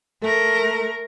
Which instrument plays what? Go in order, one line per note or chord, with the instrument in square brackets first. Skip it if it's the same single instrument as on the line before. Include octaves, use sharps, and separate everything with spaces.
[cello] A3 A#4 [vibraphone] A4